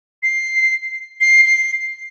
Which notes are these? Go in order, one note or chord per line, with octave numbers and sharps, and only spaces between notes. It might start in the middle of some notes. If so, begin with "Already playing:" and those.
C7
C7
C7